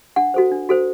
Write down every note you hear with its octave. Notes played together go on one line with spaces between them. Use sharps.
D4 F#5
F#4 A4 C5
D4
F#4 A4 C5